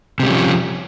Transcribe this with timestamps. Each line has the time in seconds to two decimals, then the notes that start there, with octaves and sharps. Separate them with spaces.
0.20 C3
0.23 G3
0.26 C#4
0.29 F3